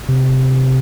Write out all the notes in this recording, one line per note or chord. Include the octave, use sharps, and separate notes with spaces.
C3